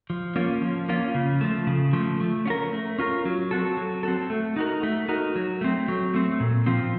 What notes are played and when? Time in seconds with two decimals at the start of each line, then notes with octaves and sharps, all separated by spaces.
0.10 F3
0.36 A#3 C#4 F4
0.62 F3
0.89 A#3 C#4 F4
1.14 C#3
1.41 F3 A3
1.67 C#3
1.93 F3 A3
2.20 A3
2.46 C#4 F4
2.50 A#4
2.72 A3
2.98 C#4 F4 A#4
3.25 F#3
3.51 C4 F#4 A4
3.77 F#3
4.03 C4 F#4 A4
4.30 A3
4.56 D#4 F#4 A#4
4.83 A3
5.08 D#4 F#4 A#4
5.36 F#3
5.61 A3 C4
5.88 F#3
6.14 A3 C4
6.40 A#2
6.66 F3 C4 F4